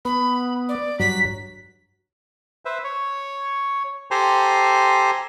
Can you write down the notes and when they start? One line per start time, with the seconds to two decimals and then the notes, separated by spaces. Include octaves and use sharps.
0.05 B3 B5
0.69 D5
1.00 G2 F#3 B6
2.65 B4 C5 E5
2.84 C#5
4.11 G4 A4 C5 G#5 A#5 C6